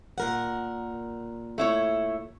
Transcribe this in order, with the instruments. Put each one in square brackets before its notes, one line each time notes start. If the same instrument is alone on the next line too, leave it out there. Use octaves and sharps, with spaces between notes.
[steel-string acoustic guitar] A#2 A#4 F#5
[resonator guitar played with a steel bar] A3 E4 C#5